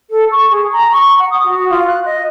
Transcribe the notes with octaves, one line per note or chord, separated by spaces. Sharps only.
A4
C#6
G#4
A#5
C#6
F#5
D#6
F#4
F4
F#6
D#5